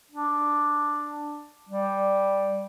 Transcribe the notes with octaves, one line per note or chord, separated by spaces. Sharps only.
D4
G3